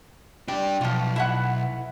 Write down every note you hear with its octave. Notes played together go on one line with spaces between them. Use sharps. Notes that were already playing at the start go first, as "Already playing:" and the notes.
G3 D4 G5
B1 F3 F4
E4 E5 F#5